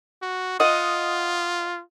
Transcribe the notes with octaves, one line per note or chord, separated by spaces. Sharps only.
F#4
F4 D#5 F#5